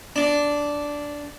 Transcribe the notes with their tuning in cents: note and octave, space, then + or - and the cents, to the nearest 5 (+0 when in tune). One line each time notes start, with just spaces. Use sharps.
D4 -10